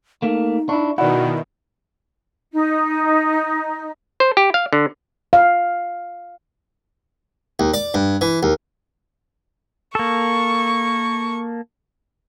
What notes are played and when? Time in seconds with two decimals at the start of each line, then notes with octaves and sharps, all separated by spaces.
0.22 A3 A#3 D#4
0.69 D4 E4 C#6
0.98 B2 D#3 E4 F#4 D5 F#5
2.52 D#4
4.20 C5
4.37 G4
4.54 F5
4.73 D3
5.33 F5
7.59 D#2
7.74 D5
7.94 G2
8.21 E3
8.43 D#2
9.95 A#3 A4 C#6